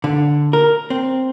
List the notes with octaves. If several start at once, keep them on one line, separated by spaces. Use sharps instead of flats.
D3
A#4
C4